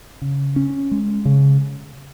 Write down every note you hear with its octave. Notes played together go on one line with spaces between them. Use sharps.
C#3
C#4
G#3
C#3